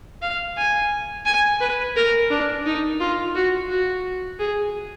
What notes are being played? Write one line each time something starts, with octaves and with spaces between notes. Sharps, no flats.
F5
G#5
G#5
B4
A#4
D4
D#4
F4
F#4
F#4
G#4